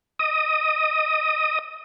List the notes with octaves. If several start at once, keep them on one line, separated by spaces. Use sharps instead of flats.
D#5 D#6